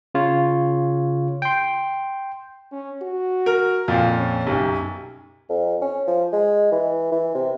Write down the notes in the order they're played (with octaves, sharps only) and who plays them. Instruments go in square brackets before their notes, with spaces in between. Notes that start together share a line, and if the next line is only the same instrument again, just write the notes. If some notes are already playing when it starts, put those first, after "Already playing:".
[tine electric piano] C#3 F4 C#5
G5 C6
[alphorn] C#4
F#4
[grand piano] A#4
[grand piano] F2 A#2 [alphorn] F4
[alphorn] C#4
[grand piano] B1 F#2 [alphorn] G4
[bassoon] F2
C#4
F3
G#3
E3
E3
C3